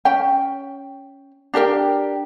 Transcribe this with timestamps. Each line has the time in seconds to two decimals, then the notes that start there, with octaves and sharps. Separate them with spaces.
0.05 C#4 G5
1.54 D4 G4 A#4 G5